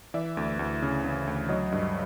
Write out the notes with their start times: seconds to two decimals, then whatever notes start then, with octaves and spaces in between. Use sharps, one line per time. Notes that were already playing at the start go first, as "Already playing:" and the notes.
0.14 E3 D5 E5
0.37 D2
0.59 D2
0.82 C#3
1.05 C#3
1.27 D2
1.49 F#3 C#5 D#5
1.72 G2